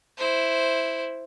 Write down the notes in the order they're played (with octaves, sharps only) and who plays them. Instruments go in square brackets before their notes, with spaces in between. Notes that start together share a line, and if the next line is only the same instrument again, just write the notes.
[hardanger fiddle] E4 C5